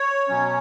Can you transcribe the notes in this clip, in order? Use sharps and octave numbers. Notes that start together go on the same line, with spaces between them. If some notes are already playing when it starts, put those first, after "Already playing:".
Already playing: C#5
B2 F#3 C#4